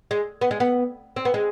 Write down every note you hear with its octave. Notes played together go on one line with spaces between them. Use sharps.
G#3
B3
G#3
B3
C4
B3
G#3